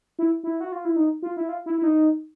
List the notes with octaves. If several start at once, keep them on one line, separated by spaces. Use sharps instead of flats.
E4
E4
F#4
F4
E4
D#4
F4
E4
F4
E4
E4
D#4